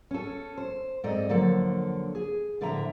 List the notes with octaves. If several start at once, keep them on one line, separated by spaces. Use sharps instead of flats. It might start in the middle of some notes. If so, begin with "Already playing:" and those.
C#4 A4
C5
G#2 C4 A4 D5 D#5 A#5
D3 F3 F#3 A#3 A4
G#4
A2 D3 F3 E5 A#5